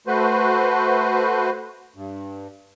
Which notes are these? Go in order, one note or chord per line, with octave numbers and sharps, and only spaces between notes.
A3 F#4 B4 C5
G2